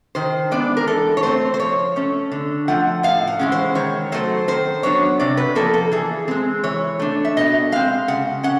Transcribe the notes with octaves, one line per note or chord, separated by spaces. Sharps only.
D#3 C5
G#3 B3 D4 D5
A#4
E3 A4
C#5
A3 C4 C5
C5
F3 C#5
A3 C#4
D3
F3 A3 F#5
A2 F5
F#5
E3 G#3 C#4
C5
D#3 C#5
F#3 A3 C5
D#3 C5
F#3 B3 D4 C#5
C3 D5
B4
F3 A#3 A4
A4
E3 G#4
G#3 C4
E3 C#5
A3 D4
E5
B2 D#5
G#3 C4 F5
C#3 F#5
C#4 F#5